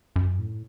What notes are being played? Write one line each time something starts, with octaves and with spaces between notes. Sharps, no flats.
F#2
A2